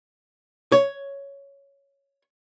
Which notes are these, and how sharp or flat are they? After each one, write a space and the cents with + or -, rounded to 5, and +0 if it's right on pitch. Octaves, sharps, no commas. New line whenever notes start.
C#5 +5